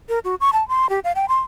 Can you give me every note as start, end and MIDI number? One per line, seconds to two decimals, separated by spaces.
0.09 0.19 70
0.24 0.35 66
0.41 0.50 85
0.53 0.67 81
0.68 0.89 84
0.89 1.00 67
1.04 1.12 77
1.15 1.25 79
1.29 1.40 84